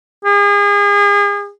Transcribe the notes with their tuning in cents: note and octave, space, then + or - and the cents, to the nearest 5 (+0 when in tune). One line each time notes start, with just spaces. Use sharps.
G#4 -35